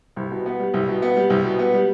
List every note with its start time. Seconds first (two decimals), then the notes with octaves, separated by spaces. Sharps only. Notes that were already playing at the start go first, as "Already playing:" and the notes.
0.16 C2
0.31 B2
0.46 B3
0.59 G3
0.74 C2
0.88 B2
1.02 B3
1.16 G3
1.30 C2
1.44 B2
1.59 B3
1.74 G3